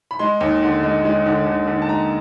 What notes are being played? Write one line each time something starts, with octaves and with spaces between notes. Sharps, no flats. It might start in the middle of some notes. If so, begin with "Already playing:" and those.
B5
G#3 C6
D#2
D3
G#3
G#3
D3
D3
D3
A5
G#3 A#5